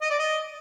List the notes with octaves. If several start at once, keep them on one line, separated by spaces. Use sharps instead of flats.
D#5
D5
D#5